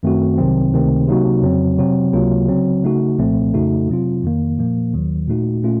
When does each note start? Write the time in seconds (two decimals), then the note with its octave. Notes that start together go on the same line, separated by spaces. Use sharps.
0.03 F#2 D#3 A3 C4 F#4
0.38 C2 C3 D#3 F#3 C4
0.73 C#2 C3 D#3 A3 C4
1.08 C3 F#3 A#3 D#4 F#4
1.42 F2 C#3 F#3 C4
1.78 C3 F#3 C4 F#4
2.13 C#2 C3 F#3 A#3 F4
2.48 C#3 F#3 C4
2.83 C#3 A3 D#4 F#4
3.18 C2 A#2 F3 A3 C4
3.54 F2 C#3 A3 D#4 F#4
3.88 C3 F#3 C4 F4
4.24 F2 D#3 A#3
4.59 A#2 F3 A#3
4.94 D#2 D#3 F#3
5.28 A#2 A3 D#4 F#4
5.63 A#2 A3 C#4 F4